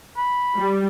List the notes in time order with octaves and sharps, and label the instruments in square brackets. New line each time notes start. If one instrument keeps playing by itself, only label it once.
[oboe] B5
[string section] G3